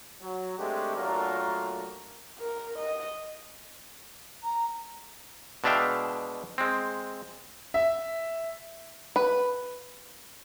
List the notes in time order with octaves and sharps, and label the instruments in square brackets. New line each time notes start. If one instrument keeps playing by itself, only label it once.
[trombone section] F#3
G#3 A3 C4 D4 G4
A#2 F#3 A3 D4 F4 A#4
[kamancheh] A#4
D#5
[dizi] A#5
[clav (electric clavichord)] B2 G#3 D4 E5 F5 G5
G#3 C4
[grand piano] E5
[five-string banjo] B4